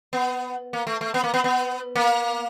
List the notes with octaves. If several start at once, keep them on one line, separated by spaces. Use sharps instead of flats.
B3
A#3
A3
A3
B3
A#3
B3
B3
A#3